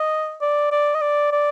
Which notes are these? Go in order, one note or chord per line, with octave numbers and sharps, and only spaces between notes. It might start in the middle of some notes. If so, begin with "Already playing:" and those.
Already playing: D#5
D5
D5
D#5
D5
D5